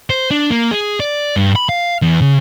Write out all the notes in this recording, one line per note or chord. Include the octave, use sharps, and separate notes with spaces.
C5
D4
A#3
G#4
D5
G2
B5
F5
E2
C#3